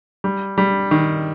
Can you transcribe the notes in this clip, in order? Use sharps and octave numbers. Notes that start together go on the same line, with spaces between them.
G3
G3
D#3